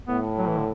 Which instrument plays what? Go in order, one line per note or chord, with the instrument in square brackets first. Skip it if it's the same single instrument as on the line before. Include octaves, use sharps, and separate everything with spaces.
[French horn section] A2 [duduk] B3
[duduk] F#3
E3
D3